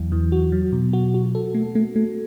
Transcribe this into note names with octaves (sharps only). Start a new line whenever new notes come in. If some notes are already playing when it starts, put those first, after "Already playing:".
Already playing: E2 E3 F#3
E3
F#4
F#3
B2
F#4
F#4
A4
A3
A3
A3